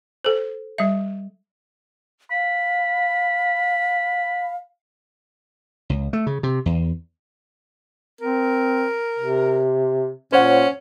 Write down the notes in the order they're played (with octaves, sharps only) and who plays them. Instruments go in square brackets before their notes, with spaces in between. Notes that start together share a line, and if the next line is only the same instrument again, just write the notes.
[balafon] A4 C5
G3 E5
[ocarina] F5 [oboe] B5
[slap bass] C#2
A3
C#3
C3
E2
[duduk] C4 [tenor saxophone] A#4
[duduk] C3
[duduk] A#2 [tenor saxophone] C#4 [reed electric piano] C5 C#5 F#5